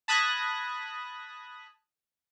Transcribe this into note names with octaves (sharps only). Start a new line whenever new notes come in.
A5 B5 D#6 F#6 G#6 A#6